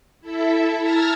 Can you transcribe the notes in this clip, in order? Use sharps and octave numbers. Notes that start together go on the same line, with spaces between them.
E4 A4 E5
A5 A#5 E6 F6 G#6 A#6